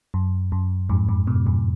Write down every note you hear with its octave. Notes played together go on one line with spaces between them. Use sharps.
F#2
F#2
F2 G#2
F2 G#2
G#2 B2
F2 G#2